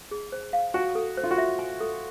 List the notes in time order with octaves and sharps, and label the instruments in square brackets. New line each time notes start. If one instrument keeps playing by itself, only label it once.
[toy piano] G#4
C5
F5
[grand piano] F#4 [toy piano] G#5
[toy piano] A4
C5
[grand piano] F4
F#4
[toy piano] E5
G#5
A4